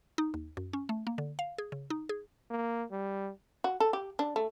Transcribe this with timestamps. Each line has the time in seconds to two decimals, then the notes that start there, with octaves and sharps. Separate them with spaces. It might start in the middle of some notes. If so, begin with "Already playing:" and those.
0.18 D#4
0.34 D#2
0.57 F#2
0.73 C#4
0.89 A3
1.07 A#3
1.18 D3
1.39 F5
1.58 G#4
1.72 C#3
1.90 D#4
2.09 G#4
2.51 A#3
2.92 G3
3.64 F#4
3.80 A4
3.93 G4
4.19 D4
4.36 A3